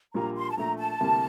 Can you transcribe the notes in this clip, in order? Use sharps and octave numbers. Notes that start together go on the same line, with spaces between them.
A#1 A#2 G3 A#3 F4 A#5
C6
A5
A#1 A#2 A3 A#5
A5
D2 C3 G3 A#3 E4